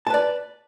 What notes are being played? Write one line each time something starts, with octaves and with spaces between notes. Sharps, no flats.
B4 D5 A5